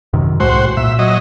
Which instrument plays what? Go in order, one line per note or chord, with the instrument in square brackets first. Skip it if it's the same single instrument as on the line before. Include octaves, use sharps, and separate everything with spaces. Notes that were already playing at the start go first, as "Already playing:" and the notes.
[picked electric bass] F#2 C3 D#3
[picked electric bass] C2 A2 G#3 [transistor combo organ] F#4 C5
[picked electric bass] A#2 [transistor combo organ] E5
[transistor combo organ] F#3 D#5